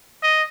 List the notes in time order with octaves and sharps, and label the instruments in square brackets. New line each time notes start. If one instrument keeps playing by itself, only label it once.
[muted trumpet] D#5